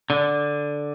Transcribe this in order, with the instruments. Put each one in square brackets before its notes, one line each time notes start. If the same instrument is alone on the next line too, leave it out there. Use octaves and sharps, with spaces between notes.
[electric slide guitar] D3